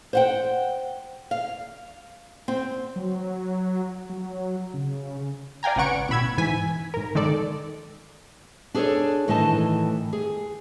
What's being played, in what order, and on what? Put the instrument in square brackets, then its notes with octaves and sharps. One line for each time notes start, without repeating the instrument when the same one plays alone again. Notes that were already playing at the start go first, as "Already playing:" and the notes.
[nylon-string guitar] C5 F#5 G5
F5
C4
[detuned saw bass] F#3
F#3
C#3
[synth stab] D5 F5 G5 G#5 A#5
G#1 C#3 B4 F#5 C#6 D7
A1 B2 B5 E6 G#6
G#2 E3 G#5 B6
G#2 A#4
D#3 G#3 A4 D5
[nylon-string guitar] D4 G#4 A4 B4 C#5 D5
A2 D#3 E3 A3 D#5 A5
G#4